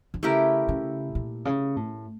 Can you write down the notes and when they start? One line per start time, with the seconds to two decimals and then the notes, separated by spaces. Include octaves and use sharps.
0.14 D3
0.22 C#3 A3 E4 G4 A#4
0.69 C#3
1.15 A#2
1.45 C#3
1.76 A2